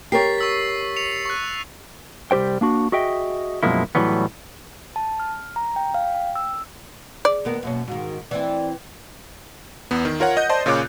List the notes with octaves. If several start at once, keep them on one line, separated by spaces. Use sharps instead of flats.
G4 A#4 C#5 A6 B6 C7
C#6 E6 B6
C#7 F7
C#6 F#6
C2 G3 G4 C5 G5
A#3 D4 F#4
F#4 G#4 D#5 E5 G5
F#2 B2 F3 G#3 A#3 E4
A2 C3 E3 F#3 G3 B3
A5
F6
A#5
G5
F5
G5
E6
G#4 D5
D#2 B3 A#4
F#2 B2 A#3 C#4
G#2 D#3 F#4
E3 C4 D5
E2 B3
D#3
F4 A#4 C#5 F#5
D#5 F#5 G6
C5 D5 D#5 A5 C6
A#2 C#3 F4 C#5 D6 F#6